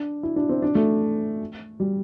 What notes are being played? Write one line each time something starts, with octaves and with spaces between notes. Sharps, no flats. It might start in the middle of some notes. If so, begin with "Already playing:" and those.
Already playing: D4
E4
D4
C4
D4
A3
G3